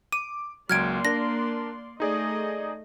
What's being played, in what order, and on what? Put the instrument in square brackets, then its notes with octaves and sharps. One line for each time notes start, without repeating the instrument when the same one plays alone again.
[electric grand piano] D6 [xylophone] D#7
[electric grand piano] C#2 F#3 [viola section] A#3 D5 C6 [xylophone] F6 G#6 D7
[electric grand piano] D4 A#4 [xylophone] A#6
[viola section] A3 D#5 [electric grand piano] D#4 G#4 D5